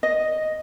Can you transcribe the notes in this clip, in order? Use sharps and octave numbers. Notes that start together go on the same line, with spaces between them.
D#5